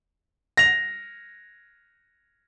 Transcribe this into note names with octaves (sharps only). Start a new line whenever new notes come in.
A#6 F7